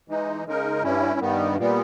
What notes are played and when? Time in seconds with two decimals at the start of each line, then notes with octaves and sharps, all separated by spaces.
0.08 E3 G#3 D#4
0.45 C#3 G#3 D#4 A#4
0.83 G2 G3 C#4 E4
1.20 G2 D#3 G3 B3
1.57 A#2 G3 B3